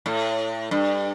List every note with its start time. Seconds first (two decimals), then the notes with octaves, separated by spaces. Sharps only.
0.06 A2
0.71 G2